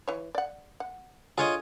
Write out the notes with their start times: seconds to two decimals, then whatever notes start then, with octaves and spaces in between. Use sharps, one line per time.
0.08 E3 C#5
0.35 D5 F#5
0.80 F#5
1.38 D3 F4 G#4 C#5 D#5